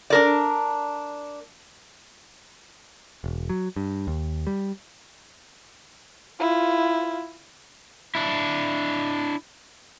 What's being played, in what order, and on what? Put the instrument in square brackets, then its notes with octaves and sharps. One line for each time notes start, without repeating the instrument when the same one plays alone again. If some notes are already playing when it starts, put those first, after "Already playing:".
[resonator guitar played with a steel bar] D4 A#4 D5
[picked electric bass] E1
F#3
G2
D#2
G3
[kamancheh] E4 F4
[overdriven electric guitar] D4 E4